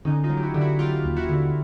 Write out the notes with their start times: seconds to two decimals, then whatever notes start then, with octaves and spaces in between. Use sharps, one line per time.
0.05 D3 C#4 D#4
0.23 D#4 F4
0.29 F#3
0.37 G4
0.43 E4 F#4
0.54 D3 G4
0.61 E4 F#4
0.79 F#3 F4 G4
1.04 D#2
1.16 E4 F#4
1.29 D3